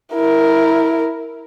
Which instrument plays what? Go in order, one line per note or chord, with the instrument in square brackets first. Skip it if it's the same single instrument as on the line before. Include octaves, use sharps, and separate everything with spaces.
[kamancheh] E4 A#4